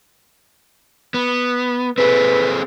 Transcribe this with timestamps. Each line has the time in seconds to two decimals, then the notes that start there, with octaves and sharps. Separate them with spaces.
1.14 B3
1.98 C4 G#4 A4 B4